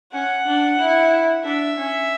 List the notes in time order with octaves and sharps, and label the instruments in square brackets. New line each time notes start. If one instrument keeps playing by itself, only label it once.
[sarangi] C#4 [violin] F#5
[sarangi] D4
E4
[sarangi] D4 [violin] E5
[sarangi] C#4